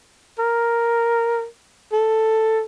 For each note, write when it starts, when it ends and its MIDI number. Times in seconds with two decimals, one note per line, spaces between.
0.39 1.45 70
1.92 2.62 69